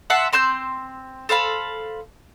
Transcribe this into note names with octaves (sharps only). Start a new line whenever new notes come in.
E5 F#5 A5 C6
C4 C6 E6 G6
A4 C5 F5 B5